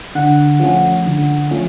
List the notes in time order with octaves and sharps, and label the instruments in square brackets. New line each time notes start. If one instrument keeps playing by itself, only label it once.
[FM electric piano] D3 F#5
F3 A3 C#4
D3
F3 A3 C#4